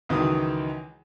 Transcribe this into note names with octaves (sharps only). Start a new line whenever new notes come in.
C#2 D#3 E3 F#3 D#6